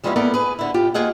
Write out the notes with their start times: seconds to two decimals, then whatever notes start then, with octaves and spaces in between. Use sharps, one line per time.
0.04 F3 G3 G#3 B3 C#4 E4
0.16 A#3 B3 E4 A4 A#4 D5
0.34 G#4 B4
0.59 D3 E4
0.74 A2 F4 G4
0.94 D#2 A#3 F4 G#4 D#5 F#5